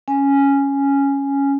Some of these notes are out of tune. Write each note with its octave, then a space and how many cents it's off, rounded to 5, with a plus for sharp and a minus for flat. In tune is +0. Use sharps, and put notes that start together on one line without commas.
C#4 +0 G#5 +0